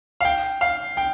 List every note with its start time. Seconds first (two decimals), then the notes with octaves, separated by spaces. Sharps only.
0.21 F5
0.25 G5
0.61 F5
0.97 G5